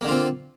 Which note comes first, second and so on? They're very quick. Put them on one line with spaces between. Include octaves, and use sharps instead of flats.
A#3 D3 F4 C4